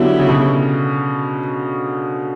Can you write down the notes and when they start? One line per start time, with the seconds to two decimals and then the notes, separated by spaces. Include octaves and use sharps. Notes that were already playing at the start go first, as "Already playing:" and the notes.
Already playing: D3 F#3 B3 E4 G4
0.19 C#3
0.29 B2